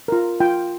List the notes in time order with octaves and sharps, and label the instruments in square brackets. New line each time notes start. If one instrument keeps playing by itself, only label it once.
[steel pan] F4 A#4
F4 G5